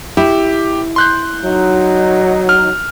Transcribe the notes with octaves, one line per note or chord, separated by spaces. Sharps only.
E4 G4
C6 F#6 G6
F#3 D#4
F6